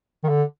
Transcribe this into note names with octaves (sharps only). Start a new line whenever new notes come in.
D#3
D3